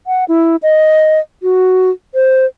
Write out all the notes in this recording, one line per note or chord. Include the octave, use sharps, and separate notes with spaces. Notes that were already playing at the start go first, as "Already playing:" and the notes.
F#5
E4
D#5
F#4
C5